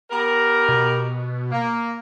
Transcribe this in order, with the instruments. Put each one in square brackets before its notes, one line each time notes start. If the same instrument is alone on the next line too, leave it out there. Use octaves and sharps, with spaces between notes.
[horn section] B3 G4 A#4
[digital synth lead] B2
[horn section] A#3